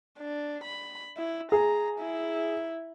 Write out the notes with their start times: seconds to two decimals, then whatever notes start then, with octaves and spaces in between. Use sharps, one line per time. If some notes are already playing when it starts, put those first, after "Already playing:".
0.19 D4
0.64 B5
1.17 E4
1.52 G#4 A#5
2.00 E4